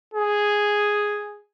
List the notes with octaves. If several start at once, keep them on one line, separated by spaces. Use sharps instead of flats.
G#4